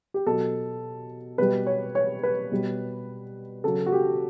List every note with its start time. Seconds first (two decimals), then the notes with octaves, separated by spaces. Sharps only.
0.14 G4
0.26 B2 F#3 A4
1.38 B2 G3 B4
1.67 C#5
1.95 C#5
2.23 B4
2.52 B2 G3
3.64 C#3 F#3 A4
3.86 F#4
3.92 G4